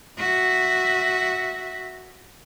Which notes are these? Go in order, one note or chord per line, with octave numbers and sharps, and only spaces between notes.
F#4 E5